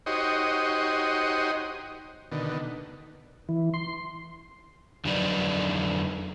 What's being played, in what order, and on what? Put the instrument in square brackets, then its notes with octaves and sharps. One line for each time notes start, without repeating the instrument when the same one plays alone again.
[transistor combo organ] D#4 F#4 G4 C5 C#5 D#5
B2 D3 D#3
[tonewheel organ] E3
C6
[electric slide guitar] F2 D3 F#3 D#4 B4 D5